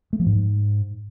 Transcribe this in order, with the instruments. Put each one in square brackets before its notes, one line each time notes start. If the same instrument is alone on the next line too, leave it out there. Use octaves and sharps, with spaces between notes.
[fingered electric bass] A3
F3
G#2